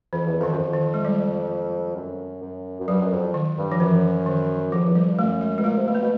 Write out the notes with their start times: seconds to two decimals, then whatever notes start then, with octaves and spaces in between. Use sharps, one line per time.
0.13 F2 E3
0.26 E2
0.40 F2 D#3
0.52 F#2
0.58 F2
0.73 D#3
0.94 G#3
1.05 G3
1.96 F#2
2.42 F#2
2.80 F#2
2.88 G2 F#3
3.01 F#2
3.11 F2
3.34 D#3
3.58 G2
3.72 F3
3.80 F#2 E3
4.26 D#3
4.72 F2 F3
4.84 E2
4.95 F2 G3
5.12 G2
5.18 F#2 A3
5.41 G#3
5.58 B2 G#3
5.64 A#2 A3
5.77 C3
5.88 B2 A3
5.95 A#3
6.02 B2